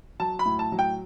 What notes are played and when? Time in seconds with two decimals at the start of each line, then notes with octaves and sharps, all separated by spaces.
0.20 F#3 A5
0.39 B5
0.46 A2
0.59 A5
0.72 F#3
0.79 G5